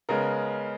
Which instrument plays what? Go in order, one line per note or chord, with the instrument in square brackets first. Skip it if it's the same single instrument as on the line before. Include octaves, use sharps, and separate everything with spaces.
[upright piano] C#3 G#3 B3 A#4